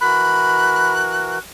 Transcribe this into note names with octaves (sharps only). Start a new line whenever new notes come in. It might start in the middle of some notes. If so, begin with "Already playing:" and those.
E3 F#4 A#4 B5 F#6